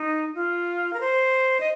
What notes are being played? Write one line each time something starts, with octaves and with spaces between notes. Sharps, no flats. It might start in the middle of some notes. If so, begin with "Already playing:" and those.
Already playing: D#4
F4
A#4
C5
D#5